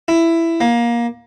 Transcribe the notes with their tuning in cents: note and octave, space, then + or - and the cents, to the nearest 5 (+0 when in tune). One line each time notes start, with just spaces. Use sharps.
E4 +10
A#3 +20